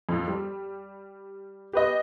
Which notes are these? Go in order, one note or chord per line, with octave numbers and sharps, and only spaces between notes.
F2 F3
G3
G4 B4 D#5